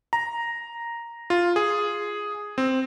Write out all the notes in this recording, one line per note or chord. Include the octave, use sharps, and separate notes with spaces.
A#5
F4
G#4
C4